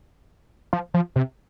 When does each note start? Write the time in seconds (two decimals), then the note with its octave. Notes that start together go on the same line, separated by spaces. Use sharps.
0.73 F3
0.94 F3
1.16 C3